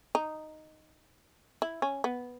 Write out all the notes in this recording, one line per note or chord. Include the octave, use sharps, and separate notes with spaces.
D#4
E4
C#4
B3